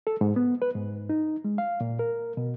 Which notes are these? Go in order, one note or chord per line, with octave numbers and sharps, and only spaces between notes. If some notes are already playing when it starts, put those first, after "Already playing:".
A4
G#2
B3
B4
G#2
D#4
G#3
F5
A#2
A#4
B2